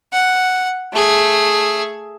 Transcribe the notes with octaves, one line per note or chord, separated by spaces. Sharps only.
F#5
A3 G#4